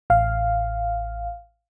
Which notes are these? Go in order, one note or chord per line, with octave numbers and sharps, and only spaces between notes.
A1 F5